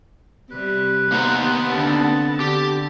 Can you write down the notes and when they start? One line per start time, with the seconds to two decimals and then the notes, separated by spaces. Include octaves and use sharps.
0.51 C3 G3 B4
1.12 A#3 B3 D#4 C5 F#5 A#5
1.71 D3 C4 D4 A5
2.40 D3 G4